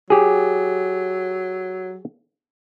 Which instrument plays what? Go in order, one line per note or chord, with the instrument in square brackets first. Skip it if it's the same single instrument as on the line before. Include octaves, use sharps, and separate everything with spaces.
[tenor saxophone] F#3 [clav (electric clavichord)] G4 G#4